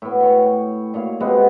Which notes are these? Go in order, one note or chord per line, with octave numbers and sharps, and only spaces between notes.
A2 B3
C#5 G5
A#2 C#5 F5
C3 G#3 B3 F#5